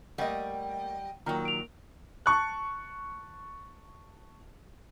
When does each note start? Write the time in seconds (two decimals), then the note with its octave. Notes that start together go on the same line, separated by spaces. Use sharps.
0.18 G3 A3 A#3 D#5 F#5 G5
1.26 A#2 D#3 F#3 G5 A#5
1.45 D7 F7
2.26 A5 C#6 F#6